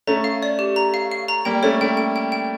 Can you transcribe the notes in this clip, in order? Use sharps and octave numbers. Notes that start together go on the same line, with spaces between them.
A3 C#4 A#5
F5
D5
G4
A#5
F5
F5
A#5
G3 A#3 G5
A3 C#4 C#5
A3 C#4 G5
G5
G5
G5